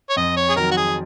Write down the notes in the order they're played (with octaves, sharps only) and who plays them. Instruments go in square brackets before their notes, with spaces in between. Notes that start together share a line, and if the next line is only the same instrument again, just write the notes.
[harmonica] C#5
[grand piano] F2 [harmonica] D#5
[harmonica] C#5
G#4
[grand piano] D#3 F#3 [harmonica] A#4
[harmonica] F#4
G#4